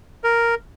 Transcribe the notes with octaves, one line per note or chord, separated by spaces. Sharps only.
A#4